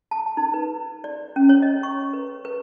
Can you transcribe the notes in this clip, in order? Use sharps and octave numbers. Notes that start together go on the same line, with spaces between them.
A5
D#4
B4
D5
C#4
C#5
D#5
C#6
B4
B4